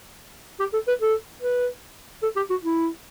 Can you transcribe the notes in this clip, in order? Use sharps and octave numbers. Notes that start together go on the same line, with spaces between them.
G4
A4
B4
A4
B4
A4
G4
F#4
E4